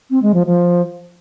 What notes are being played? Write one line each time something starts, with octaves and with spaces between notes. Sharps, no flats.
C4
G#3
F3
F3